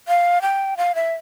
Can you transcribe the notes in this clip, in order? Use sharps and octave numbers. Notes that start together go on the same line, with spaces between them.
F5
G5
F5
E5